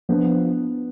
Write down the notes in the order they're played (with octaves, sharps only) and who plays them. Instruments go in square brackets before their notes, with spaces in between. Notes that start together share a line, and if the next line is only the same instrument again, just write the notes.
[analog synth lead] F3 [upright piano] B3 D4